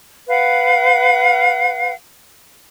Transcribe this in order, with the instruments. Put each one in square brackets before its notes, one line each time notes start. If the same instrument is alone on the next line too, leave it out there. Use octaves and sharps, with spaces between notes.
[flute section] B4 F5 F#5